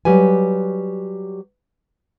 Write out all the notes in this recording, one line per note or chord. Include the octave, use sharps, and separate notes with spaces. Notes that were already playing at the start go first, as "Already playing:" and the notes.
F#3 G3 G4 B4 G#5